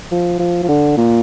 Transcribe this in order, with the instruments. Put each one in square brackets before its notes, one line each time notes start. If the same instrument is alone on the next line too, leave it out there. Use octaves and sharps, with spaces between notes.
[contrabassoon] F3
F3
F3
D3
A#2